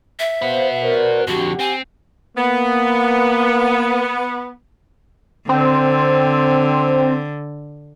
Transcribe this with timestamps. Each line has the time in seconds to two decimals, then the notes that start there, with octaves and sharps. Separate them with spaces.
0.19 E5
0.42 F#4 B4 C5 F5
0.80 A#4 C5 D5
1.27 F2 D3 F#4 G4 F#5
1.59 C4 G#5
2.36 A#3 B3
5.49 D3 C4